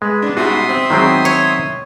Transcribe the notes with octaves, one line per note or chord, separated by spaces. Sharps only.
G#3 B4
B3 D4
G#2 B2 G3 F#4 E5 C6 D#6
C4
B2 D#3 F#3 G#3 C4 G5
C#5